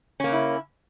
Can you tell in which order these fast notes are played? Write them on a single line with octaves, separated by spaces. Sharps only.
C#4 A#3 C#3 E4